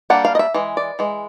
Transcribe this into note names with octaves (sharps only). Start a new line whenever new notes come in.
G3 A#3 D4 F#5
F5
D#5
E5
E3 G#3
D5
E3 G#3